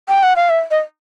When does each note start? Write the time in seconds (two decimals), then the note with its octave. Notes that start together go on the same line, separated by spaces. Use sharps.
0.08 G5
0.23 F#5
0.36 F5
0.50 E5
0.71 D#5